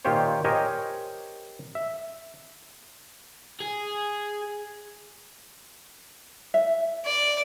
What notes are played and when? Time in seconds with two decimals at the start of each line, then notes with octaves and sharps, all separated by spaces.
0.05 A#2 D#3 F4 G4 C5 C#5
0.44 G4 A#4 C5 C#5 D#5 G#5
1.75 E5
3.61 G#4
6.54 E5
7.05 D5